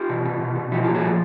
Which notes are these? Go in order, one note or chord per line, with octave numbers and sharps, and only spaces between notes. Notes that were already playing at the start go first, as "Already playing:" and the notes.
Already playing: F4 G4
B2
B2
B2
B2
F3 E4 F#4
A#2 F4 G4
F#4 G#4
F3